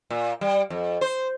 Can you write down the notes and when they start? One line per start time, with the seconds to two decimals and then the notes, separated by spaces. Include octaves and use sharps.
0.10 A#2
0.41 G3
0.70 F2
1.01 C5